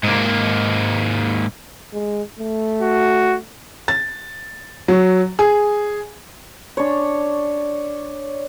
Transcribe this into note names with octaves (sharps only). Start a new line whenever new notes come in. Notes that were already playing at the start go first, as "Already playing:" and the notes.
G#2 A#3
G#3
A3
F#4
A6
F#3
G#4
D4 C#5